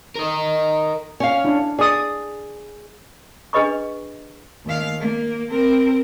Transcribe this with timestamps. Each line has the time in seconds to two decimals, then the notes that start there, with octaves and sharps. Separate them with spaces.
0.16 A#4 D#5
1.20 C#4 F5
1.45 D4 E4
1.79 G#4 D5 D#6
3.53 D4 G#4 B4 D#5 B5 C#6
4.65 D#2 F5
5.00 A#3
5.51 C4 A#4